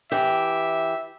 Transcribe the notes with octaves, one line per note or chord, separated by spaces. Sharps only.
E3 G4 E5